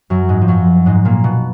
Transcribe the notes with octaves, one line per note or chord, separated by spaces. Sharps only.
F#2 F#3
G#2 G#3
F3
F#2 F#3
G#2 G#3
A#2 A#3
B2 B3